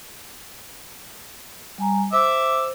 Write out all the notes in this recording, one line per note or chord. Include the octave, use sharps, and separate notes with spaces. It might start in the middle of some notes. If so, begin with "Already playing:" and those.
G3 G#5 A#5
C5 E5 D6 E6